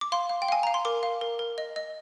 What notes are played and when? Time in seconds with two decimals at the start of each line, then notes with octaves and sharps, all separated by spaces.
0.01 D6
0.12 F5 C6
0.29 F5
0.42 G5
0.48 F5 G#5
0.63 F5 A#5
0.74 C6
0.85 A#4 D6
1.03 F5
1.21 A#4
1.39 A#4
1.58 D#5
1.76 D#5